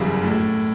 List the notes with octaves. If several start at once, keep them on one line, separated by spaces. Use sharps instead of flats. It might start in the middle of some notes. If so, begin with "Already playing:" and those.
Already playing: G1 F#2 C#3 E3 G3
A2